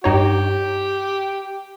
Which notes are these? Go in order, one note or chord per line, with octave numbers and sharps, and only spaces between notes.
G2 D#4 G4 C#5